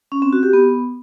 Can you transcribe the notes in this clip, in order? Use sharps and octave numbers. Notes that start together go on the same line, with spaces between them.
C#4
C4
F#4
G4
B3